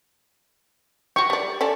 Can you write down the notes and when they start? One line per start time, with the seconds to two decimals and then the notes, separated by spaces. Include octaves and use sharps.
1.16 F#4 G4 C#6
1.30 G3 D5
1.61 C#4 A4 D5